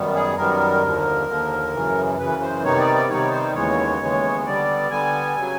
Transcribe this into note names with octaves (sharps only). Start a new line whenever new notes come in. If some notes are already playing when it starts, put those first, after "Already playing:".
Already playing: F#2 D#3 G3 B3
G#4
F#2 D#3 G3 B3 A#4
D#2 D3 F3
D#2 D3 F3
F#2 C#3 E3
F#2 C#3 E3 B4
C5
C3 D#3 G3 B3 D#4 C#5
D5
D5
C3 D#3 G3 B3 D#4 C#5
C5
D#2 C#3 E3 G#3 B3 C#5
D#2 C#3 E3 G#3 B3
D3 G3 B3 D5
D3 G3 B3 G#5
C#3 F#3